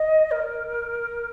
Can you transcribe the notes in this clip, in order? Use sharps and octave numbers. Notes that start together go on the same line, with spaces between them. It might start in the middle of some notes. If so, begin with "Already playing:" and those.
Already playing: D#5
A#4